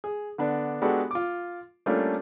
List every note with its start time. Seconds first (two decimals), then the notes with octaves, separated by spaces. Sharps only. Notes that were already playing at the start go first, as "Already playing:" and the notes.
0.04 G#4
0.38 D3 B3 D4
0.82 G#3 B3 D4 F#4 G4 A4
1.11 F4 D6
1.86 G3 A3 A#3 C#4 D4 F4